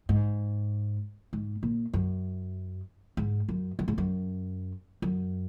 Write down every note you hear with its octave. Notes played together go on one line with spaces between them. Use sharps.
G#2
G#2
A#2
F#2
G#2
F#2
F#2
G#2
F#2
F#2